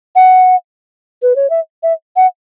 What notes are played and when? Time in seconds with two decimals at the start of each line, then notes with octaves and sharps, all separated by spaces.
0.15 F#5
1.22 B4
1.36 C#5
1.50 E5
1.83 E5
2.16 F#5